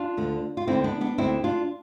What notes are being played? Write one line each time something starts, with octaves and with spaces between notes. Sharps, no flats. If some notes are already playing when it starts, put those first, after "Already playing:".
Already playing: D4 F4
D2 D3
F4
D2 D3 C4 E4
B3 D4
B3 D4
D2 D3 C4 E4
D4 F4